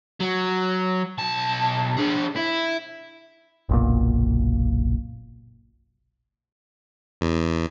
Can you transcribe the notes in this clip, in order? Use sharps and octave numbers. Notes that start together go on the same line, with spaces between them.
F#3
B1 A5
D4 G#4
E4
F#1 B1 A#2
E2